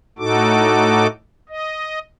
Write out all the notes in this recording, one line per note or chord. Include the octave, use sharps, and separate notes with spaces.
A2 D#4 F#4 A4 D6
D#5